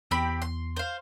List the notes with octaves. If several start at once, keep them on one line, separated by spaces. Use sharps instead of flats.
E2 C4 G4 B5
C6
C5 F5